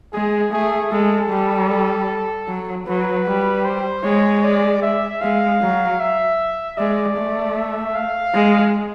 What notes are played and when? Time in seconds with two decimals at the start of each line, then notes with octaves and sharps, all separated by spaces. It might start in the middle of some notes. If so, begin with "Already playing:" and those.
0.13 G#3 G#4
0.52 A3 G#4
0.91 G#3 A4
1.30 G3
1.69 A4
2.48 F#3
2.87 F#3 B4
3.26 G3
3.65 C5
4.04 G#3 C#5
4.44 D5
4.82 E5
5.21 G#3 F5
5.61 F#3
6.00 E5
6.78 G#3 D5
7.17 A3
7.56 E5
7.95 F5
8.34 G#3